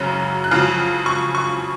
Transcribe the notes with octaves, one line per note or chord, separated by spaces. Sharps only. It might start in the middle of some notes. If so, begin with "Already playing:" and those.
Already playing: F#2 C#3 F#3 C#4 F#6
F#6
F2 C#3 F#3 F6
C#6
C#6